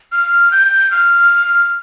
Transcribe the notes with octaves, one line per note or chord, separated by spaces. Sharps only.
F6
G6
F6